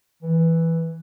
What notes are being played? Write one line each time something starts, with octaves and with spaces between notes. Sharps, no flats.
E3